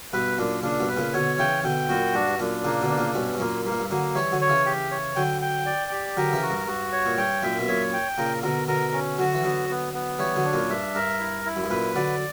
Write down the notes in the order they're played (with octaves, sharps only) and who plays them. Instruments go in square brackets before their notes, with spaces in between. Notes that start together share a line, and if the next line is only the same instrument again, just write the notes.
[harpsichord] G2 B2 [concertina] B4
[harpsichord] F#2 A#2 [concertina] D4
[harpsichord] A#2 C#3 [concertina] D4
[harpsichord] G2 B2
[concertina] B4
[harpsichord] A#2 C#3
[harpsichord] B2 D3 [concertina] C#5
[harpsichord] C#3 E3 [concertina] G5
[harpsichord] B2 D3 [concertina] G5
[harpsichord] F#2 A#2 [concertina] F#4
[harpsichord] G2 [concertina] D4
[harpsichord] G2
[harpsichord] F#2 A#2 [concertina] D4
[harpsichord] A#2 C#3 [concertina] A#3
[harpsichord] B2 D3
[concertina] D4
[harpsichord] A#2 C#3
[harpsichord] G2 B2 [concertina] C#4
[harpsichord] G2
[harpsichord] F#2 A#2 [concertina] A#3
[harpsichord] G2 [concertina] A#3
[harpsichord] A#2
G2
[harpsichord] D3 F#3 [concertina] A#3
[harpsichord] E3 G3 [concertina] C#5
[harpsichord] D3 F#3
[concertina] C#5
[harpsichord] C#3 E3
[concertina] G4
C#5
[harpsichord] D3 F#3 [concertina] G5
[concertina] G5
D5
G4
[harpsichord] D3 F#3 [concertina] A#4
[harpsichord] C#3 E3
[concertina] F#4
[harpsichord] G2
[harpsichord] G2 [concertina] F#4
[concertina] C#5
[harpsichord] A#2
[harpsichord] G2 [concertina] G5
[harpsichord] F#2 A#2 [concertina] E5
[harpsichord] B2
[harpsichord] F#2 A#2 [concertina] C#5
[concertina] G5
[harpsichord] A#2 C#3 [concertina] A#4
[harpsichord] B2 D3 [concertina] A#4
[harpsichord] B2 D3 [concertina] A#4
[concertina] C#4
[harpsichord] D3 F#3 [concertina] F#4
[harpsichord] E3
[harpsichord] D3 F#3 [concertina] B3
[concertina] B3
B3
[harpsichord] E3 G3 [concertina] C#5
[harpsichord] D3 F#3
[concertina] D4
[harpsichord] F#2 A#2
[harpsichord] G2 [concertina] E5
[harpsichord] G2 [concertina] A#4
[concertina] E4
E4
[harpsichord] F#2
G2
[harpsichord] F#2 A#2 [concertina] B4
[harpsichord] D3 F#3 [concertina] D5